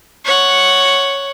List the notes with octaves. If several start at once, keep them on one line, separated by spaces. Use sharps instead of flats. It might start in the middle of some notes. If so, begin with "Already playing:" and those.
C#5 F#5